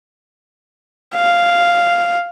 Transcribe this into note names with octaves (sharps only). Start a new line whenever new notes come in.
F5